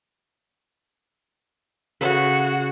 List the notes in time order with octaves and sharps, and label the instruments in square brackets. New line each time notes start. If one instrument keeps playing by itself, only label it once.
[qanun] C#3 A4 B4 [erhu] F#4